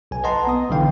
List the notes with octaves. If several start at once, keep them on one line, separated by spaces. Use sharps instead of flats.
B1 G#5
B4 D#5 F#5 A5 A#5 C6
B3 D#6
B1 D3 E3 D#4 F5 G5